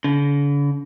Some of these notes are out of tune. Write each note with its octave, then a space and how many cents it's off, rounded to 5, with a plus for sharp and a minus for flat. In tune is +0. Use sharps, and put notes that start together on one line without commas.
D3 -45